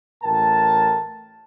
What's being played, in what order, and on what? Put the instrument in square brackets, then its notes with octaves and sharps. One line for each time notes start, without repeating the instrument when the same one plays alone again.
[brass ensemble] A1 A2 A#4 G5 A5